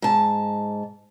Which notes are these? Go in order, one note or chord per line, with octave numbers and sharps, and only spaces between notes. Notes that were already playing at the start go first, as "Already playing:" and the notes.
G#2 A5